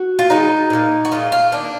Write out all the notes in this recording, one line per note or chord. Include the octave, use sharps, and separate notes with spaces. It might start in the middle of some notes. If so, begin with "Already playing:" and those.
Already playing: F#4
F4
D#3 G#3 B3 D#4
A#2 F3 A#3
F#4
A#2 F3 G#3 F4
F4
D#3 A#3 D4